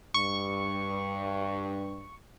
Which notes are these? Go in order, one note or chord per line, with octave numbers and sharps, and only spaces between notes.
G2 C#6